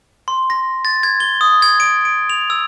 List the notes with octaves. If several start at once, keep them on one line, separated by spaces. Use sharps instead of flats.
C6
A#6
A6
G#6
G7
D#6
G#6
D7
D7
F7
E6